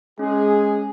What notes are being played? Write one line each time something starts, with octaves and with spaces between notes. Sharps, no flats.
G#3 C#4 G#4